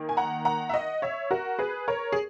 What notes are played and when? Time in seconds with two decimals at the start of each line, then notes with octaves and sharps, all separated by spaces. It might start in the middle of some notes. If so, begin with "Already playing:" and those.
Already playing: D#3 A#3
0.09 G#5
0.17 F#5 A#5
0.45 F#5 A#5
0.69 E5
0.74 D#5 F#5
1.02 C#5 E5
1.31 F#4 A#4
1.59 G#4 B4
1.88 A#4 C#5
2.12 G#4